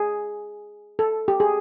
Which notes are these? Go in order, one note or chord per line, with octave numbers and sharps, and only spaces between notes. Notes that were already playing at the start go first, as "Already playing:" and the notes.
Already playing: G#4
A4
G4
G#4